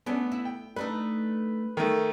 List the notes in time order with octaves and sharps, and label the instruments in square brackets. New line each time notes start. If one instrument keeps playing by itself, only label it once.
[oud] A3 C#4 D4 [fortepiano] B3
[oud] E4
[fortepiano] G5
[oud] A3 D4 D#4 [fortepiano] B4
[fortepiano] D#3 A3